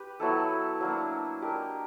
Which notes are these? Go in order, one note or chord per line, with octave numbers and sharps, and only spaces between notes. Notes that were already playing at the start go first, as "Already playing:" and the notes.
Already playing: G4 B4
F#3 B3 E4 A4
F#3 A#3 D4
D4 G4 A#4 D#5